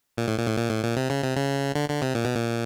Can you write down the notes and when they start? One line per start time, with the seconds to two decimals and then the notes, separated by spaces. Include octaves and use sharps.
0.17 A#2
0.28 A2
0.38 A#2
0.47 A2
0.57 A#2
0.70 A2
0.83 A#2
0.97 C3
1.10 C#3
1.23 C3
1.36 C#3
1.75 D3
1.89 D3
2.02 C3
2.15 A#2
2.25 B2
2.35 A#2